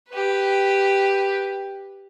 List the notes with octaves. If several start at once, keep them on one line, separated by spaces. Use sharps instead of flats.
G4 B4